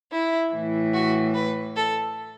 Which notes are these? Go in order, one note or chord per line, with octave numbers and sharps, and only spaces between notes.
E4
A2 E3
F#4
B4
A4